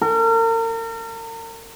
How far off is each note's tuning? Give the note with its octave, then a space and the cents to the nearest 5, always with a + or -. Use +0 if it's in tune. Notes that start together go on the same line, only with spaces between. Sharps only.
A#4 -40